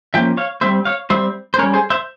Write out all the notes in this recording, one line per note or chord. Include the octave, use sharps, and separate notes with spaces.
F3 A#3 C#4 E5 G5
C#5 F5
G3 C4 C5 E5
C#5 F5
G3 C4 C5 E5
C5
G3 C#4 A#4 C#5
G#4 C5
C5 E5